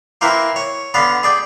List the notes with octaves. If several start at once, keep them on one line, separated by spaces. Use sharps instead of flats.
A#3 C4 E4 A#4 B4
C#5
D3 B3 B4 F5
G#4 D5 G5